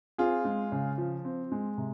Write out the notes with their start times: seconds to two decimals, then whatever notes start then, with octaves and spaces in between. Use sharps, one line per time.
0.18 C4 F4 G#4
0.45 G#3
0.72 C#3
0.98 F3
1.25 C4
1.52 G#3
1.78 C3